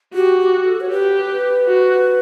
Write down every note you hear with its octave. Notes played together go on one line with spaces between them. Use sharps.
F#4 G4
G4
A4
C#5
G4 B4
F#4